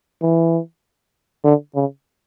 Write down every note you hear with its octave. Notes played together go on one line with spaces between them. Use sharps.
E3
D3
C#3